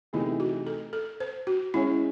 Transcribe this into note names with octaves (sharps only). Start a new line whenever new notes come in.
C3 E3 A3 D#4 E4 G#4
F#4
A4
A4
C5
F#4
G#3 C#4 E4 G#4 C#5 E5